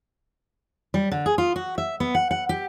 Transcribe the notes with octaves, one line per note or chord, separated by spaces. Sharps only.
G3
D3
G#4
F4
F#4
E5
B3
F#5
F#5
G4